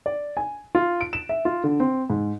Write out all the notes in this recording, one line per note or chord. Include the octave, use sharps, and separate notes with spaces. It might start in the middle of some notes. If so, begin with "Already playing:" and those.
D5
G#5
F4
D7
E7
E5
F4
D3
C4
G#2